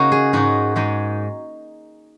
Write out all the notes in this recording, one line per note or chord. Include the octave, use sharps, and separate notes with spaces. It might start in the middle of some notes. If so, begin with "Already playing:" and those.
Already playing: C#3 A#3 D#4 F#4
G#4
G#2 G#3 D#4 F#4
G#2 G#3 D#4